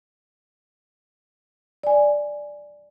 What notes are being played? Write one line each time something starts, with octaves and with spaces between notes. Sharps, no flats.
D5 G#5